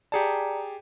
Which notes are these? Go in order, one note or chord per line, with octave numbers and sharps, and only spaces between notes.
G4 G#4 D5 A5 A#5 C#7